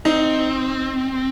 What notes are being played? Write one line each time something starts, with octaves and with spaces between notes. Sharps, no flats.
C4 D#4